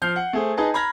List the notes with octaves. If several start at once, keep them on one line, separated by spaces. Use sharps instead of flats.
F3 F6 G6 C7
F#5
A3 G#4 C5
D#4 G#4 B4 D#5 A5
A#5 B5 F6 G#6 A#6